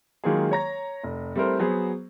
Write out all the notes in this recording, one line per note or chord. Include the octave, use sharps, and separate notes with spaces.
D#3 F#3 G#3 A#3 F4 G#4
C#5 A#5 A#6
F1
G3 A3 C4 E4 A#4 C5
F#3 B3 G#4 C5